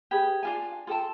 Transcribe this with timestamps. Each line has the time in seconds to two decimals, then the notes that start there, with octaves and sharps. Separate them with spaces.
0.11 G4 G#4 B4
0.43 D4 F4 G#5
0.87 F4 A4 G5 A5